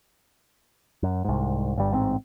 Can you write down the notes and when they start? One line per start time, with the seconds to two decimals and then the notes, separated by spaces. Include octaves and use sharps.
1.03 F#2
1.25 C2 G#2
1.76 G1 G2 G3
1.91 A1 G#2 B2 C4